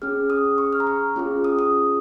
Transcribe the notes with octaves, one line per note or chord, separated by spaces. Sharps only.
C#4 G#4 F6
D#6
C#6
F6
A#5
C#6
C#4 F4 G#4
D#6
D#6